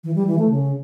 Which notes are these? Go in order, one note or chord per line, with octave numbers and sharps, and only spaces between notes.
E3
G3
E3
A3
C#3